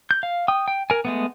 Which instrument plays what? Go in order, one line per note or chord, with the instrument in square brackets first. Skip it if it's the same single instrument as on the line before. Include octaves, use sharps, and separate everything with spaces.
[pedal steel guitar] G6
F5
G5 D#6
G5
A#4 G#5
G#3 A3 B3